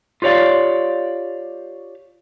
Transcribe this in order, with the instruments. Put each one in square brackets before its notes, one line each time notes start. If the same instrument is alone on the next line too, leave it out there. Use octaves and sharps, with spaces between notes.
[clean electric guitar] F4 G4 C#5 D5 F5